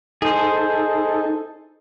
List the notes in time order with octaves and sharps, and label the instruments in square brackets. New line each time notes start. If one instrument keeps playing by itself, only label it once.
[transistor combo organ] D#4 A4 [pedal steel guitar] G#4 C5